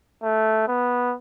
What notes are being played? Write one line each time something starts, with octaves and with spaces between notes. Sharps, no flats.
A3
B3